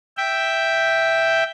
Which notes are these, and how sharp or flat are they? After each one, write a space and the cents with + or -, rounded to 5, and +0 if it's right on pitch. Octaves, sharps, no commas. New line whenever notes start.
E5 +0 G5 +0